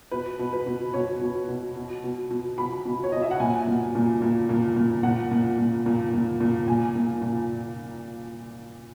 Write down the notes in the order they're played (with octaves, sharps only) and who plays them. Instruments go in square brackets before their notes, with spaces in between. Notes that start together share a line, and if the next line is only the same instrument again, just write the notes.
[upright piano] B2 B4
B2
B4
B2
B2 C#5
B2
B2
B2
B2
B2
B2 B5
B2
C#5
B2 D#5
E5
F#5
A#2 G#5
A#2
A#2
A#2
A#2
A#2
A#2 F#5
A#2
A#2
A#2
A#2
A#2
A#2 G#5
A#2
A#2